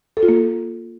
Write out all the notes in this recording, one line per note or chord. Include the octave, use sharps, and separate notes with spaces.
A4
F4
A#3